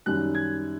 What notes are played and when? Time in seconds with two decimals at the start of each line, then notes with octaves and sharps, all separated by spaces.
0.06 F#2 D#3 G3 F#6
0.35 G#6